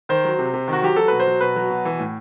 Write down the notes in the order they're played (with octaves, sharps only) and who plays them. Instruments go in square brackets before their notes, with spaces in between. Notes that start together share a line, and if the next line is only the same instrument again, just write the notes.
[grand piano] D#3 C5
F#3
C3
C3
D#3 F#4
F#3 G4
F#3 A4
B2 B4
C5
F#3
B2 B4
F#3
B2
E3
A2